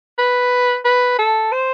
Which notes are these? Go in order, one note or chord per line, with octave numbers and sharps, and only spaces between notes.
B4
B4
A4
C5